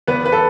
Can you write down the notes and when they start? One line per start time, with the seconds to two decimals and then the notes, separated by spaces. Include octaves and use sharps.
0.07 E2 B3 B4
0.26 B4
0.32 A4